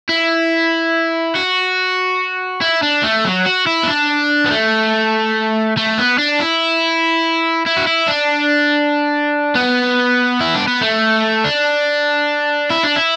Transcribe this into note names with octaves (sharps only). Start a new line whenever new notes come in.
E4
F#4
E4
D4
A3
F#3
F#4
E4
B3
D4
B3
A3
A3
B3
D4
E4
E4
F#4
E4
D4
B3
E4
D4
B3
A3
D4
E4
D4
E4